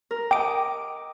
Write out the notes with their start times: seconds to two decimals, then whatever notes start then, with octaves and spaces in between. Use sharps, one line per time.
0.11 A#4
0.31 D#5 G5 D6 D7